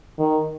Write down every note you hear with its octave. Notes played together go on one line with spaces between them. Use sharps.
D#3